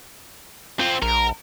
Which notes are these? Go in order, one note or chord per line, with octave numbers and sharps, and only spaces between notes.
C4 F4
A#1 A#4